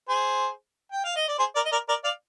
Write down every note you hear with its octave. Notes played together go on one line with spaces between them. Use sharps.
G#4 C5
G5
F5
D#5
D5
G#4 C5
A#4 D5
D#5
A#4 D5
A#4 D5
D5 F5